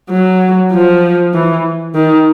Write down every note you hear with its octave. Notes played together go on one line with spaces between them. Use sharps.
F#3
F3
E3
D#3